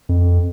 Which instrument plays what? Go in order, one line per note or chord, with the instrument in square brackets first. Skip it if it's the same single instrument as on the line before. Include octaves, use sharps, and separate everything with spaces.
[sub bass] F2